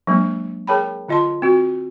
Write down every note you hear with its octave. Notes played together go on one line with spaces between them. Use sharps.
F#3 G#3 A#3 D4
G#4 A#4 C#5 G5 A5 B5
D3 F4 D#5 A5 C6
C4 F#4